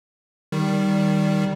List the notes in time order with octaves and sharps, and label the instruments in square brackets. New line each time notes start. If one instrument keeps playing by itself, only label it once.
[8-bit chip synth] D#3 G3